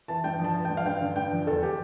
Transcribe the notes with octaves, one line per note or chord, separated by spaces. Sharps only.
E3 A5
G2 G5
F3 A5
F3
G5
G2
F5
G2 G5
D3
G2 G5
F3
E2 A4
G4